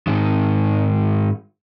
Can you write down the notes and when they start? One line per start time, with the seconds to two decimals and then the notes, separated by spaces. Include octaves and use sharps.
0.07 G#2 D#3